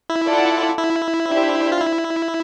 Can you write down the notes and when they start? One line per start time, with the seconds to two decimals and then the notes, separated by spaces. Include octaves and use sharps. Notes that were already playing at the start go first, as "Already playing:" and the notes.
0.10 E4
0.27 F4 A4 D5 F#5 A5
0.78 E4
1.29 D4 G4 C5 E5
1.72 F4
1.81 E4